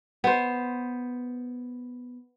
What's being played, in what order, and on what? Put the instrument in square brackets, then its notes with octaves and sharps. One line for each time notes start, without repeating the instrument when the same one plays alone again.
[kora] B3 C5